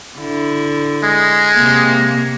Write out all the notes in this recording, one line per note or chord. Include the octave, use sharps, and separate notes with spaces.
D3 E4
G#3
C3 A#3